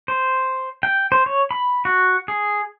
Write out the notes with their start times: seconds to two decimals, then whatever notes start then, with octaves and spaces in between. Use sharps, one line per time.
0.08 C5
0.83 G5
1.12 C5
1.26 C#5
1.51 B5
1.85 F#4
2.28 G#4